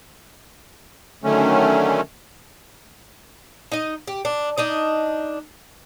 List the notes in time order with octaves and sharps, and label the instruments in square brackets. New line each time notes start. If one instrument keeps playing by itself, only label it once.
[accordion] D3 D#3 F#3 A3 C#4
[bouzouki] D#4 D#5
G4
D4
D4 D#4 D#5